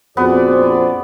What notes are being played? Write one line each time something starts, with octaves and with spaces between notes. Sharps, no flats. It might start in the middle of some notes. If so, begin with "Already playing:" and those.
A#1 F2 B3 F#4 G#4 C5 D5